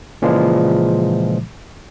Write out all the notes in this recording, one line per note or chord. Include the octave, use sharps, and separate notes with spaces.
A#2 C#3 E3 F3 G#3